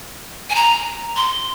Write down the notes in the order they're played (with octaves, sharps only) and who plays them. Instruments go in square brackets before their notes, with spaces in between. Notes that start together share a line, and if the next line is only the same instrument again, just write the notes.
[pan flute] G#5
A#5
C6